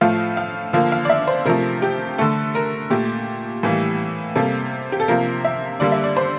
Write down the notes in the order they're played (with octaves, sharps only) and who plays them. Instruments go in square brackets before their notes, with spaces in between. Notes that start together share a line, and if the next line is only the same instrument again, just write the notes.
[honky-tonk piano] A2 F3 A3 F5
F5
D3 F3 A#3 F5
F5
D5
E5
C5
C3 F3 A3 A#4
G4
D3 A3 A4
A#4
A#2 A3 G4
A2 E3 G3 A#3
C3 G3 A#3 A4
G4
A4
C3 F3 A#3 A#4
E5
D3 G3 A#3 D5
E5
D5
C5